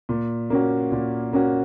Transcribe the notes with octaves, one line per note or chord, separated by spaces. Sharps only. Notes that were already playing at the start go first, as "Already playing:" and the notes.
A#2
A#3 C#4 F#4
A#2
A#3 C#4 F#4